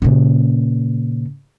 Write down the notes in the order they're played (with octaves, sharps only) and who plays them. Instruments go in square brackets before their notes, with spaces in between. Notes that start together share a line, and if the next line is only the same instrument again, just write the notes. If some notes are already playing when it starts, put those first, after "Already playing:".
[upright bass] A#2 C#3